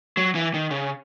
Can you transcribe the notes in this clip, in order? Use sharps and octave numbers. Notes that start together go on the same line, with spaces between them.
F#3
E3
D#3
C#3